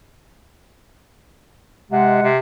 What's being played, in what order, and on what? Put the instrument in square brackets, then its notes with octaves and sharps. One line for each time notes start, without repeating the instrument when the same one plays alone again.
[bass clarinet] C3 [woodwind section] G#3 F#5
[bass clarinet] C3